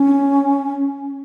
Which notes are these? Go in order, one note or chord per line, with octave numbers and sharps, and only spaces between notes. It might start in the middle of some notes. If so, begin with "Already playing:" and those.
Already playing: C#4